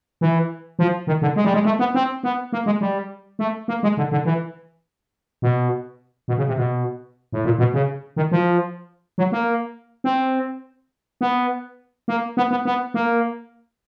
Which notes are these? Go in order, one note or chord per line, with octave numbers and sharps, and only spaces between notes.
E3
F3
D#3
D3
G#3
G3
G#3
A3
B3
C4
B3
A#3
G#3
G3
A3
A#3
G#3
D3
D3
E3
B2
B2
C#3
C3
B2
A2
A#2
B2
C#3
D#3
F3
F#3
A#3
C4
B3
A#3
B3
B3
B3
A#3